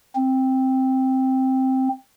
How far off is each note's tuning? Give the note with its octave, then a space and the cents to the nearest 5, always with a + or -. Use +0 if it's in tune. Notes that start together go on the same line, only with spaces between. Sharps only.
C4 +5